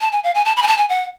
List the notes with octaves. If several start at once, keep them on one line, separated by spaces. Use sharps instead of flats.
A5
G#5
F5
G#5
A5
B5
G#5
A5
G#5
F#5